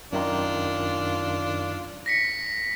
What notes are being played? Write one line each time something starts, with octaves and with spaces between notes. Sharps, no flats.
F#2 D#3 D4 D#4 F4
A#6 B6 C#7